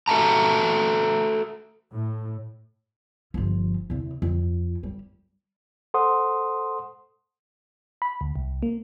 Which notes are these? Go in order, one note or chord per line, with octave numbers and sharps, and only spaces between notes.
F#4 A4 E5 A5 A#5
A2
G1 F3
E2 C3
F2
G3
A4 C5 F#5 C6 D#6
B5
D2
C2
A#3